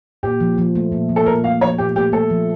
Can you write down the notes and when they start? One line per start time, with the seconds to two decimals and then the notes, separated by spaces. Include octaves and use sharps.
0.23 A#2 G4
0.40 F3
0.58 F3
0.75 A3
0.92 A#2
1.09 F3
1.16 A4
1.26 A#2 A#4
1.44 A3 F5
1.61 F3 C#5
1.78 A#2 G4
1.96 A3 G4
2.12 A3 A4
2.30 F3